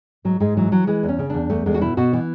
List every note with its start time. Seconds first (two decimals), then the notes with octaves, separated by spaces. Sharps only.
0.25 G#2 F#3
0.40 G#2 G#3
0.57 E3 F#3
0.72 E3 F#3
0.87 E3 G#3
1.03 E2
1.09 C#4
1.19 C#3
1.30 E2 D4
1.50 E2 A3
1.66 E2 G#3
1.74 F#4
1.81 B2 E4
1.97 B2 F#4
2.13 E3